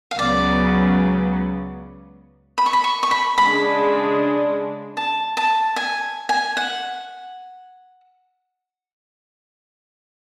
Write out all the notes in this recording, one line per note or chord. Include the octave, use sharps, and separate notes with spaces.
F5
C#2 C#3 F#3 B3 D5
B5
C#6
B5
C#6
C#6
B5
C#3 G#3 D4 B5
A5
A5
G#5
G#5
F#5